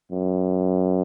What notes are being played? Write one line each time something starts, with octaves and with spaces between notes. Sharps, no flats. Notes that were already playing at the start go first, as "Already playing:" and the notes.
F#2